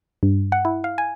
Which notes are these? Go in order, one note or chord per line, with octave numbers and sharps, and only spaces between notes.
G2
F#5
E4
F5
G#5